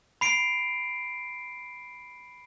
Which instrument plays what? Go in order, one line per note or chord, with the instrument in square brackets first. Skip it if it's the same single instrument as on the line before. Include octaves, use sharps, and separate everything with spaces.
[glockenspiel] B5 C7 D7